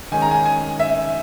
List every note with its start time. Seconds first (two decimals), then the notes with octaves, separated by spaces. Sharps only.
0.12 D#3 G#3 C#4 G#5
0.22 A#5
0.31 G#5
0.46 G#5
0.80 E5